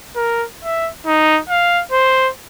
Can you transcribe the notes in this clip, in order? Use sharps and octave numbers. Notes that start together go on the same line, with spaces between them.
A#4
E5
D#4
F5
C5